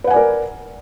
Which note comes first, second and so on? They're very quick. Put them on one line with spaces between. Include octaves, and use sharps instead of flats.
B4 F#5 G#5 D5 A#4